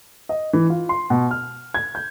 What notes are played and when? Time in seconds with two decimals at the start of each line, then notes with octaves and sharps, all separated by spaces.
0.29 D#5
0.53 E3
0.70 F4
0.89 C6
1.10 B2
1.31 F6
1.75 G#6
1.95 G6